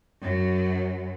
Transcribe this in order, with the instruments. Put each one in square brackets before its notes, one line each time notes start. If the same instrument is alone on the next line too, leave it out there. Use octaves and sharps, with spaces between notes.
[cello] F#2 F#3